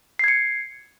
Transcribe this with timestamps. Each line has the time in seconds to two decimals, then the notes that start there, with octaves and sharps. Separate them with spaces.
0.19 C7
0.24 G#6
0.28 C#7